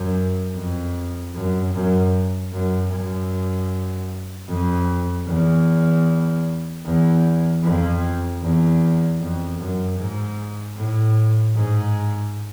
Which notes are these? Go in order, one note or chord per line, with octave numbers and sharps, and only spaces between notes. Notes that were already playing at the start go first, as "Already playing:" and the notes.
Already playing: F#2
F2
F#2
F#2
F#2
F#2
F2
E2
E2
F2
E2
F2
F#2
G#2
A2
G#2